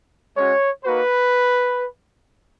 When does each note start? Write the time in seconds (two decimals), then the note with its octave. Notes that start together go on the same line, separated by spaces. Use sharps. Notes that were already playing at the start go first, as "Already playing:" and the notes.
0.36 G#3 C#4 F#4 C#5
0.84 A#3 D#4 F#4 B4